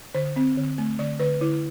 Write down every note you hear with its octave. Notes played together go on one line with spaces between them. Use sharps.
D3 C5
C4
D3
A3
D3 D5
D3 B4
D3 E4